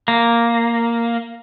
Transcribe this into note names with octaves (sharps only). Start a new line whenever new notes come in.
A#3